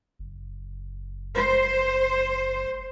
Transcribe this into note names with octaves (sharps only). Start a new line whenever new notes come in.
F#1
C5